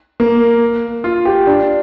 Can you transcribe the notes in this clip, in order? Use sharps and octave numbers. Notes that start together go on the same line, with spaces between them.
A#3
F4
G4
D4